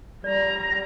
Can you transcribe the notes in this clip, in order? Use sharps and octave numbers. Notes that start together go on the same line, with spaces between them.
G3 D5 A#5